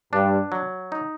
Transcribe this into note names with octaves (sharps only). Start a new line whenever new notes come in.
G2 D4
F#3
D#4